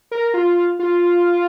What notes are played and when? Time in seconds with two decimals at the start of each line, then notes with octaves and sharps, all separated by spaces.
0.11 A#4
0.34 F4
0.79 F4